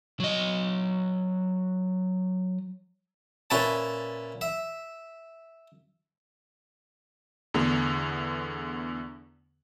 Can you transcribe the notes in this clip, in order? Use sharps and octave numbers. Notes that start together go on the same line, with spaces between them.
F#3 D#5
A#2 C#4 B4 C#5 E5 A5
E5
E2 D3 A3 B3